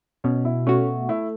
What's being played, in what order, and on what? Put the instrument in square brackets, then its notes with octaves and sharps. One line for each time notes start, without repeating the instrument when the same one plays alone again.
[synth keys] B2 [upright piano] C#4
[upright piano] E4
[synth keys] A3 F#4 [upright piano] C#4
[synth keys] A3 [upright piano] E4